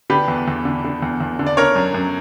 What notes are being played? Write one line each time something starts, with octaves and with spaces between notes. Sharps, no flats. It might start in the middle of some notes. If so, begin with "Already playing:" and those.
D3 G4 B4
E2
E2
D3
D3
E2
E2
D3
D5
D3 A#4 C#5
F#2
F#2